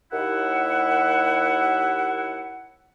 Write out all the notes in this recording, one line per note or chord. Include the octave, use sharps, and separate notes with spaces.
D#2 E4 F#5